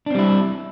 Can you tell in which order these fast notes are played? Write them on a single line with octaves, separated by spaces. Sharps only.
D4 C4 G3 E4